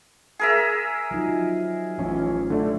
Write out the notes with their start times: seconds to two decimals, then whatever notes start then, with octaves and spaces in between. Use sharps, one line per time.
0.39 G#4 A#4 E5
1.11 F3 F#3 D#4
1.98 A1 F3 C#4
2.50 D3 A3 D5